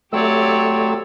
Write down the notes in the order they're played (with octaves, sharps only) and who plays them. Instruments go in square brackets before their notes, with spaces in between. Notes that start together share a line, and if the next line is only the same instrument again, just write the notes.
[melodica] F#3 C4 E6 [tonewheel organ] A3 [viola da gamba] G4 C#5 D5